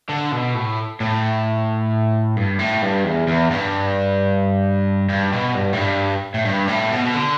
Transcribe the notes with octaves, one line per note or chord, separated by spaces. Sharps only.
D3
B2
A2
A2
G2
A2
G2
E2
E2
G2
G2
B2
G2
A2
G2
A2
G2
A2
B2
B2
D3